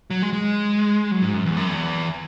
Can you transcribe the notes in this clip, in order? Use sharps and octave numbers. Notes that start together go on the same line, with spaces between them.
F#3
G#3
G#3
F#3
G#2
F#2
E2
F#2
E2